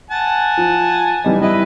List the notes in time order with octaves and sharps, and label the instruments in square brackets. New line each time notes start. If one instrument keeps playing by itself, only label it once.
[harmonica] F#5 G#5 A5
[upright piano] F3
E3 G3 D#4
[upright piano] G3 E4 [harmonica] B4 D#5